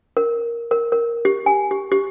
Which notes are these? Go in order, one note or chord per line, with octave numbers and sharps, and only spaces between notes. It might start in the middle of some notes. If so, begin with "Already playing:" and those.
A#4
A#4
A#4
G4
G#5
G4
G4